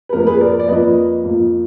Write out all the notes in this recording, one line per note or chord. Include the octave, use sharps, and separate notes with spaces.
B4
F2 F3 A#3 A#4
G#4 B4
A#4 D5
D5
F2 F3 A#3 B4 D#5
F2 F3 A#3